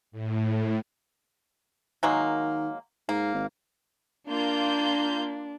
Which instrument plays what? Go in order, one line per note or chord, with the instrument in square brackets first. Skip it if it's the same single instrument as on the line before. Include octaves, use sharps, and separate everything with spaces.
[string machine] A2
[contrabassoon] D#3 [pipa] F#3 G#3 A#3
[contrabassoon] G#2 [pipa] A#3
[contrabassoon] G#1
[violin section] A#3 F4 G6 [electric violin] D4